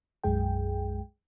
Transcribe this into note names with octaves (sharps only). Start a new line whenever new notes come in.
B1 F#2 G#3 G#4 G5